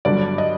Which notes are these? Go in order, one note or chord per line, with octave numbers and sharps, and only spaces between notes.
G1 G2 D3 F#3 D5
D#5